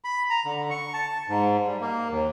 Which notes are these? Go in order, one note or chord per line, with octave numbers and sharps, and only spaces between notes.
B5
A#5
D3
C#6
A5
G#2
G3
A#3
D#2